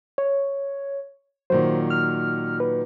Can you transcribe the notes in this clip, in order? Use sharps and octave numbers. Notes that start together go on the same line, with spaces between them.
C#5
A#2 D#3 F#3 C5
F6
B4